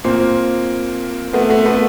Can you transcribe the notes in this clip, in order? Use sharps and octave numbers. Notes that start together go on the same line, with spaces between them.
A#2 A#3 C4
A3 B3
A3 B3
A3 B3